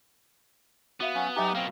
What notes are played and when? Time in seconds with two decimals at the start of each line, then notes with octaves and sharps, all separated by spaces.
1.00 B3 F#4 E5 F5
1.15 F#3 C#4 F5
1.36 F#3 D#4 G4 E5 G#5
1.55 B2 A#3 C4 F5